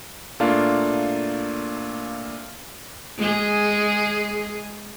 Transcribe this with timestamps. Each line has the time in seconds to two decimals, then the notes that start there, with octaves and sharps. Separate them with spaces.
0.40 A#2 A3 A#3 D4 F4
3.17 G#3 G#4